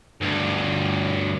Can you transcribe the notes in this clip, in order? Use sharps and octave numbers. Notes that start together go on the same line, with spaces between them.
D2 G2